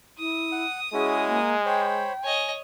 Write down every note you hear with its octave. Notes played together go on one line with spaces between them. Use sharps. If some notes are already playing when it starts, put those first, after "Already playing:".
E4 D#6
F#5
G#3 C#4 E4 F#4 G#4
A#3
C5 C#5 G5 B5
C#5 D#5 G#5